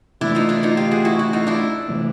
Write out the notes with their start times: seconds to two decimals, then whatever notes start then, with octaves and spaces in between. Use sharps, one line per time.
0.21 C3 E3 A3 D4 E4
0.35 D#4 F4
0.49 D4 E4
0.63 D#4 F4
0.77 F4 G4
0.91 F#4 G#4
1.05 E4 F#4
1.19 E4 F#4
1.33 D#4 F4
1.47 D4 E4
1.89 C3 E3 A3